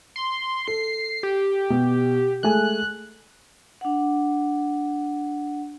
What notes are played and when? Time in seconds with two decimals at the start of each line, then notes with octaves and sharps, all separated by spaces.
0.16 C6
0.68 A4 C7
1.23 G4
1.70 B2
2.43 G#3 A3 G#5 F#6
3.81 D4 F#5